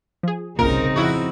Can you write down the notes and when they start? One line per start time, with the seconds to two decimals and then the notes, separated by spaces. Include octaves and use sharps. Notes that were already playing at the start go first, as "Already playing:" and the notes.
0.23 F3 G#4
0.59 G1 C2 A#2 C#3 C4 D#4 A#4
0.96 F2 E4 F#4